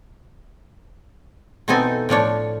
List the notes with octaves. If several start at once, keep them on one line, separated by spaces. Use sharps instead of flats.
B2 E3 C4 D#4 A4 G#5
A2 F3 D4 C#5